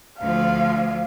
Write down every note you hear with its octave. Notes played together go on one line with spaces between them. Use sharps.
D2 F3 F5